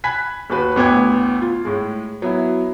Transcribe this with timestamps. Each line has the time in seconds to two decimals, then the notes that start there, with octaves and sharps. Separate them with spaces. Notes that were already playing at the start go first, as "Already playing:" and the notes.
0.04 G#5 B5 F#6 B6
0.50 D#2 F#4 B4
0.75 A1 D2 B3 G5 D6 G#6
1.42 F4
1.65 A2 G#3
2.22 F#3 B3 E4